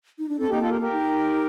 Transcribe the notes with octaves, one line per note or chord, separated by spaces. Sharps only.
D#4
D4
C4 A4
A#3 D#4 G4
F4 A4
G4 A#4
G4 A#4
D#4